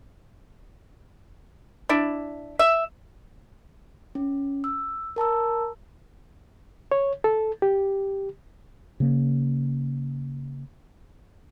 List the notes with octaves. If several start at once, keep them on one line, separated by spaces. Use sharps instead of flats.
D4 E4
E5
C#4
E6
A#4 A5 A#5 E6
C#5
A4
G4
C#3 A#3